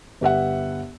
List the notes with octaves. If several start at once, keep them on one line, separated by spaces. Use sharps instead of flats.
G1 G4 E5 F#5